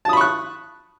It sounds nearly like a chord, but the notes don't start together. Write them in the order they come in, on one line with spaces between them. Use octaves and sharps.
A5 D#6 B5 C#6 F#6